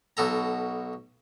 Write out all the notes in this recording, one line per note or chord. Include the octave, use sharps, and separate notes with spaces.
B1 B2 A4 A#5